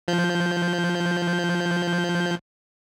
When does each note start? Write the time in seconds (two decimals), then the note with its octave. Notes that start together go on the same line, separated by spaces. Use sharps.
0.08 F3 G6